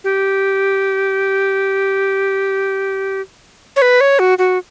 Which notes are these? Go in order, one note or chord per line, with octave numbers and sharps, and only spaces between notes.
G4
C#5
B4
C#5
F#4
F#4